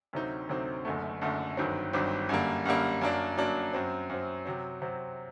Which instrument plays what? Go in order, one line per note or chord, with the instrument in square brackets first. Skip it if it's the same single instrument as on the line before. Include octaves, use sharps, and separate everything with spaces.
[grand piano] D2 C3 F#3 C4 D#4
D2 C3 F#3 C4 D#4
F#1 F#2 D3 A3
F#1 F#2 D3 A3
G1 G2 D#3 F#3 C4
G1 G2 D#3 F#3 C4
F#2 D3 G3 A#3
F#2 D3 G3 A#3
F#2 F#3 A#3 D4
F#2 F#3 A#3 D4
F#2 F#3 C4
F#2 F#3 C4
C3 F#3 C4
C3 F#3 C4